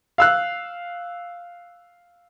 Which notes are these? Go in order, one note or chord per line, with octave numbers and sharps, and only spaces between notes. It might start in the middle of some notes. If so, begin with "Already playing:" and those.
F5 E6 F#6